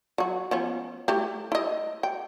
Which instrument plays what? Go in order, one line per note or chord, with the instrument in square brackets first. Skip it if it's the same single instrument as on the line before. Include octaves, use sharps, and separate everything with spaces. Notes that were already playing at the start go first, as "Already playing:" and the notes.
[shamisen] F#3 F#4
F3 B3 C#4
A3 E4 G4
E4 D#5
G5